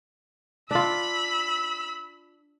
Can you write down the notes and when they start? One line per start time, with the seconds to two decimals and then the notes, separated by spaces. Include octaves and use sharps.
0.71 D4 F4 B5 E6